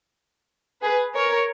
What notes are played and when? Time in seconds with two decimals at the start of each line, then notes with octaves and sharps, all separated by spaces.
0.83 G#4 B4
1.16 A#4 C#5